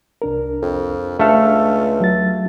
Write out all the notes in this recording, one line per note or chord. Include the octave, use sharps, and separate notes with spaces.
C2 D4 A#4
F2
C#2 A3 D4 A4 F5 F6
F#3 A6